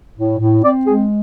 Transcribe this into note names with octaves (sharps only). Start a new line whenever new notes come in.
A2
A2
C4 D5
G#3 G#4